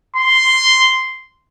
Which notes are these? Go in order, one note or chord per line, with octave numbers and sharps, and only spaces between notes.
C6